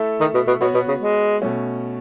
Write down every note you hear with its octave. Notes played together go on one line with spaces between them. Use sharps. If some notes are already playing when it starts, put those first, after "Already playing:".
Already playing: A3 E4 A4 E5
D#3
B2
B2
B2 B3 F#4 C#5
B2
C#3
G#3
B2 A3 C#4